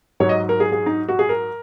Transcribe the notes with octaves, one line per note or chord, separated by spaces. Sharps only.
G#2 F#3 C#5
D#5
A#4
G#4
G#4
D#4
F#4
G#4
A#4